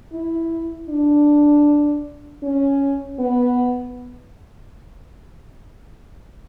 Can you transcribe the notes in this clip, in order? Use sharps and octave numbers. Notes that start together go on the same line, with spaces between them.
E4
D4
C#4
B3